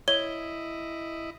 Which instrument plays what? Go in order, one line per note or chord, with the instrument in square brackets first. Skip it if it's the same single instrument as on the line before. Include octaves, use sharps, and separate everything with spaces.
[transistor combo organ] E4 D#5 [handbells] C#5 [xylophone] G7